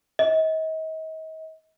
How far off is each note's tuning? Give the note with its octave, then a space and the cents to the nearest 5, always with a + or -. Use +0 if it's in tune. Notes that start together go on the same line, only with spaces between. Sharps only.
D#5 +40